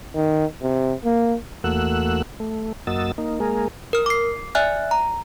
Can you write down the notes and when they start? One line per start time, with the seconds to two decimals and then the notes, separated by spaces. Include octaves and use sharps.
0.16 D#3
0.63 C3
1.05 A#3
1.64 E2 A3 A#3 F#4 E6 F#6
2.40 A3
2.87 F#2 A#3 F#4 D#5 E6 A6
3.18 A#3 D#4
3.40 G#3 A#3 G#4 A#4
3.93 A#4 F6
4.06 D6 C7
4.55 D5 E5 G#5 F6 F#6
4.91 A#5